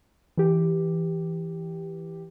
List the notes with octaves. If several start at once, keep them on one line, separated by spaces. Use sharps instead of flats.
E3 G4